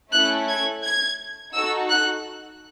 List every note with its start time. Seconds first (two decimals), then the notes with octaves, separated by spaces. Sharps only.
0.12 A3 C#4 E4 A4 F#6
0.48 G#6
0.84 G#6
1.55 D#4 F#4 A4 E6
1.90 F#6